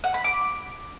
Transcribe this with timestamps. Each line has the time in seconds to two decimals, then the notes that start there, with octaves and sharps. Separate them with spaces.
0.04 F#5
0.14 B5
0.24 D6